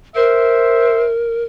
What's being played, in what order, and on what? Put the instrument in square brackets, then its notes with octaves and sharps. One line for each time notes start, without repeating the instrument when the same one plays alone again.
[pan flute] A#4 [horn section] C5 E5